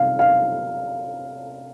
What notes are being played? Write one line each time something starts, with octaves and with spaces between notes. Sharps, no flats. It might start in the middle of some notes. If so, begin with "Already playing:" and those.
Already playing: C3 F5
F5